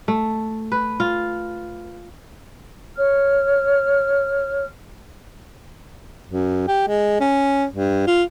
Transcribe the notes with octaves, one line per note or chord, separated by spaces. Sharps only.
A3
B4
F4
C#5 F6
F#2
G4
G#3
C#4
G2
F4